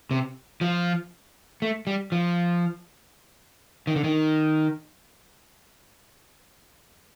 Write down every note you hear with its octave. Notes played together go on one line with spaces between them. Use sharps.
C3
F3
A3
G3
F3
D#3
D3
D#3